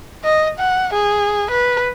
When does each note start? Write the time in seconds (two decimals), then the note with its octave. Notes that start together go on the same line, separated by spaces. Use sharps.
0.24 D#5
0.59 F#5
0.94 G#4
1.51 B4